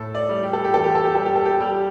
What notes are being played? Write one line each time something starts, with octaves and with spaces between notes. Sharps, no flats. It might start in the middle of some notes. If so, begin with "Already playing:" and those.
Already playing: A2 A4
D5
G3
G4
A4
G4
E2 A4
G4
A4
G4
G3 A4
G4
A4
G4
G3 G4